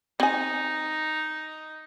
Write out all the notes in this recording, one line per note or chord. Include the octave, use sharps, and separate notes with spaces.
C4 D#4 G#5